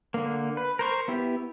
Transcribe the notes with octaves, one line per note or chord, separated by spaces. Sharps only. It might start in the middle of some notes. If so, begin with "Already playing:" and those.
D3 A#3
B4
A#4 C5 C#6
B3 E4 G4